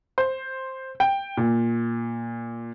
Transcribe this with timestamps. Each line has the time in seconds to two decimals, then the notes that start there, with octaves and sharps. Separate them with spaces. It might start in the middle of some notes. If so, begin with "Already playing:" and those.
0.18 C5
1.00 G5
1.37 A#2